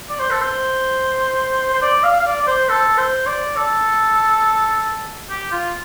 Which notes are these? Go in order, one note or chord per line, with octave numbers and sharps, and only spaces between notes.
D5
C5
A4
C5
C5
D5
F5
F5
D5
D5
C5
A4
C5
D5
A4
G4
F4